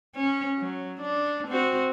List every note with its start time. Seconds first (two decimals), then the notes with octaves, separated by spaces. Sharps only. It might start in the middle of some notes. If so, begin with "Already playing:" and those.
0.16 C#4
0.58 F#3
1.01 D4
1.48 C4 F#4